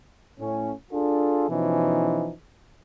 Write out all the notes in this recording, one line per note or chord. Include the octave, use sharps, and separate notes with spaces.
A2 C#4
D4 F4 G#4 A4
B2 E3 F3 C#4 D#4